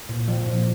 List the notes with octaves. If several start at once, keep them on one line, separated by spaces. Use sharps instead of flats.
A#2
F3
A#2